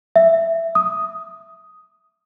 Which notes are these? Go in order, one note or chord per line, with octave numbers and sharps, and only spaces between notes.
E5
D#6